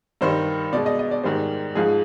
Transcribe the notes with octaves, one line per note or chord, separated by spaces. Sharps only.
G2 D#3 G3 C5
B2 G#3 D5
D#5
D#5
D5
G#2 D#3 G3 C5
G#2 F3 G#3 G#4